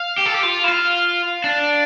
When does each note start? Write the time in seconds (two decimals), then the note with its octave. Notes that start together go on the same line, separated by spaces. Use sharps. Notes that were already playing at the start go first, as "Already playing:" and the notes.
Already playing: F5
0.18 G4
0.26 A4
0.34 G4
0.43 F4
0.64 E4
0.68 F4
1.44 D4